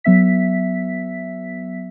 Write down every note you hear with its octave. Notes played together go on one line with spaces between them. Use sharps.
F#3 B3 E5 B6